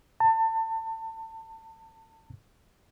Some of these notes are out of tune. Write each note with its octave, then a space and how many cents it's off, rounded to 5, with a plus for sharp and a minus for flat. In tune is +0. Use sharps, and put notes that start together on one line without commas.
A5 +30